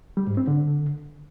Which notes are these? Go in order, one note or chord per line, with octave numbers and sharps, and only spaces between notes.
G3
G#2
C4
D3